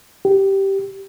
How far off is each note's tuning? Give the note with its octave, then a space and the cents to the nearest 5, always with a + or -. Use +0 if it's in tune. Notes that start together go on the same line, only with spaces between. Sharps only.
G4 -10